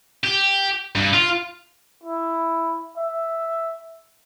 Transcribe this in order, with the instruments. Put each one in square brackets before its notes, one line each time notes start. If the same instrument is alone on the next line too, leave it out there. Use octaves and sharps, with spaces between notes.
[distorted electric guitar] G4
G2
F4
[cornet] E4
E5